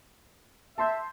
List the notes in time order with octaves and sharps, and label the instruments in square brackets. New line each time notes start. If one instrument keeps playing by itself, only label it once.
[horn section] E5 [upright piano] A5 C6 G6